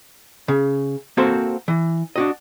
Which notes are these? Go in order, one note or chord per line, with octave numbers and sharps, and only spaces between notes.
C#3
A#3 C4 F#4 A4 C5
E3
D4 F#4 D#5